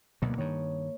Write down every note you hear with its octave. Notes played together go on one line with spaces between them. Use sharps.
D2 B2 D3 F#3 A#3
G2 D#3 C#5